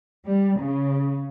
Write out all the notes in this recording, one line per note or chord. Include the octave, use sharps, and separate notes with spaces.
G3
C#3